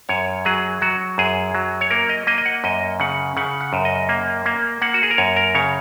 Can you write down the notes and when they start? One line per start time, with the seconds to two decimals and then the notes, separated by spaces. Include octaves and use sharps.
0.09 F#2 C#5
0.45 F#3 G#4
0.82 F#3 F#4
1.18 F#2 G#4
1.55 F#3
1.81 C#5
1.91 A#3 A#4
2.09 D#5
2.27 A#3 D#5
2.38 D#5
2.45 F#5
2.64 F#2 D#5
3.00 C#3 F#5
3.37 C#3 F#5
3.61 F#5
3.73 F#2
3.85 D#5
4.09 A#3
4.46 A#3
4.82 A#3 F#5
4.94 F#4
5.03 G#4
5.11 A#4
5.18 F#2 C#5
5.36 A#4
5.55 C#3 C#5